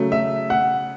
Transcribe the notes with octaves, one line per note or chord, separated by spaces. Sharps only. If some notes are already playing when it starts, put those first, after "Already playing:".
Already playing: C#3 F#3 A3
E5
F#5